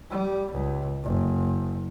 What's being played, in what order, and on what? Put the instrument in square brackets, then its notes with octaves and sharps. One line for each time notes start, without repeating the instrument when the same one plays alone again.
[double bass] G3
C#2
F#1